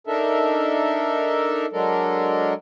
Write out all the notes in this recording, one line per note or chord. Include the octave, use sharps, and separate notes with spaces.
D4 D#4 A4 A#4 E5
F#3 G#3 D4 A4 A#4